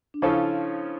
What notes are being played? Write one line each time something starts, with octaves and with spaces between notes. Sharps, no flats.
D4
C#3 F3 C#4 E4 F4 A4